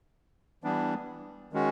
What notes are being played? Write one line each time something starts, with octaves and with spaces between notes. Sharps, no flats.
E3 G3 B3 D4
D#3 G#3 C#4 F#4